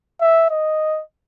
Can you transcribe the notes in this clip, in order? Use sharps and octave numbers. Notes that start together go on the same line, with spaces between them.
E5
D#5